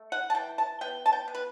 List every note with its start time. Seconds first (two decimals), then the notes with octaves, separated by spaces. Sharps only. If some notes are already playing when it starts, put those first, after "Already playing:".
Already playing: A3
0.12 F#5
0.30 A5
0.35 E3 G5
0.58 A5
0.81 B3 G5
1.06 A5
1.13 G5
1.28 B3
1.35 B4